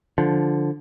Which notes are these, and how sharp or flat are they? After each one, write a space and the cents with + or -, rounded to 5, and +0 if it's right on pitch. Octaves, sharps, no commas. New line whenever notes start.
D3 +0 F3 +0